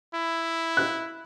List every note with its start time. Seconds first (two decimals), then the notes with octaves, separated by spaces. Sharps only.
0.14 E4
0.77 F#6